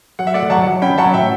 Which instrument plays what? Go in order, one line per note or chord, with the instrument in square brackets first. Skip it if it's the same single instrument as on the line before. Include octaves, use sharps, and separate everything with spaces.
[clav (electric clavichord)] F#3 [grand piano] F#5
[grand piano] E5
[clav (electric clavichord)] A3 [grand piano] D5 F#5
[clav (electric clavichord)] F#3 [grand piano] F#5 A5
[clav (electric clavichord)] F#3
[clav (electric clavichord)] C#4 [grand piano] G5 B5
[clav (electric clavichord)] F#3 [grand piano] F#5 A5
[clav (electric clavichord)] A2 [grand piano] E5 G5